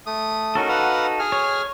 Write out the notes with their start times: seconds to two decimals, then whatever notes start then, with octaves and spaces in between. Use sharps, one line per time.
0.06 A3 D#6
0.55 C#4 D#4 F#4 A4 A#4
0.69 B4 F5 F#5
1.20 G#4 G#5 F6
1.32 C#5